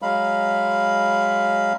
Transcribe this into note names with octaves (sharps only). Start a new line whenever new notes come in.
F#3 G#3 F5 B5